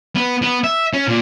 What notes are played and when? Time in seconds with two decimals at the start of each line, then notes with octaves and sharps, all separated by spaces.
0.16 B3
0.42 B3
0.64 E5
0.94 C#4
1.08 A#2